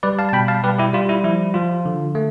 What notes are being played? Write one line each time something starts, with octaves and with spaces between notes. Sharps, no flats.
G3 B4 D5
F5 A5
A5
B2 G5 B5
F5 A5
G3 G4 B4
E4 G4
G3 F4
E4
F3 E4
F3 F4
D3
A3